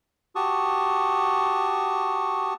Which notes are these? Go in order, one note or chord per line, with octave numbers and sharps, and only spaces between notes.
F#4 G4 A5 C#6 D#6